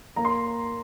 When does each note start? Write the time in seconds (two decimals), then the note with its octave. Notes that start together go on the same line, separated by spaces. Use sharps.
0.16 A#3 A#5
0.25 C6